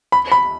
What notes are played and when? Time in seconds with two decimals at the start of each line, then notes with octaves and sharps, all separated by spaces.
0.12 B5
0.32 B5